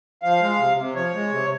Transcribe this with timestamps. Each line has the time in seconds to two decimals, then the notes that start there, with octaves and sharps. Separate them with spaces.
0.23 F3 F5
0.41 G#3
0.59 C3
0.77 C3
0.95 F3 C#5
1.14 G#3
1.31 C3